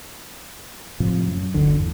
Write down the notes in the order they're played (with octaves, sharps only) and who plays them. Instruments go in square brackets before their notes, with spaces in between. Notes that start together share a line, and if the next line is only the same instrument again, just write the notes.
[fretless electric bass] A2 C3 F3
F#2
G1 D2 D3
E2